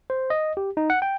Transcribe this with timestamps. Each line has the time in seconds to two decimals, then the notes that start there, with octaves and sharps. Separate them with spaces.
0.10 C5
0.30 D#5
0.57 G4
0.77 D#4
0.90 F#5
1.02 G5